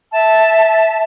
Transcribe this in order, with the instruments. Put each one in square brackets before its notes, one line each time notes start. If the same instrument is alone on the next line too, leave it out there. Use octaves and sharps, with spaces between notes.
[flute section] E5 A5